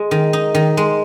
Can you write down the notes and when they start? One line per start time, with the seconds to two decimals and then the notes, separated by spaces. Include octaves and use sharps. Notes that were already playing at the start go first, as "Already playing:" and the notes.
Already playing: G#3
0.11 D#3
0.33 D#4
0.55 D#3
0.77 G#3